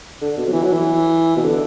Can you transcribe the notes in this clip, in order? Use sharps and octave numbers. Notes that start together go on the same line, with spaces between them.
D3
B2
F#3
E3
F#3
E3
B2
D3